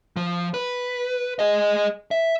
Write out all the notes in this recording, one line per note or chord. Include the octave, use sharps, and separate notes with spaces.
F3
B4
G#4 D#5
E5